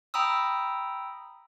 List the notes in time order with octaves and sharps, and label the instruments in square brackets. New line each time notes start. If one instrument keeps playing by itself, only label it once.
[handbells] G5 A#5 B5 D#6 E6